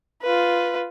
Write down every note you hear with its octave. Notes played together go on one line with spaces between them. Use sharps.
F4 B4